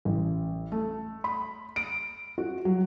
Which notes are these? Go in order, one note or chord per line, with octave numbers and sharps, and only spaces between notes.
A1
A3
B5
D7
F#4
F#3